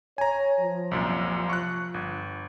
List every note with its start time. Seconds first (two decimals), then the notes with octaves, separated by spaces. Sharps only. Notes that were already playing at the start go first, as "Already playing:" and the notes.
0.18 C#5 G#5 A#5
0.60 F3
0.91 C2 F#2 A#2
1.50 C#6 F#6
1.94 G1